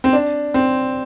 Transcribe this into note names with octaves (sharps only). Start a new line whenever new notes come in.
C4
D4
C4